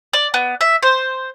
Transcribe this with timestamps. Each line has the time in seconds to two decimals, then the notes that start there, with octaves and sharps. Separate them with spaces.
0.13 D5
0.34 B3
0.61 E5
0.83 C5